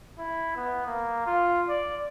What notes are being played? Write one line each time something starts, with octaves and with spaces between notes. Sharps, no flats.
E4
B3
A#3
F4
D5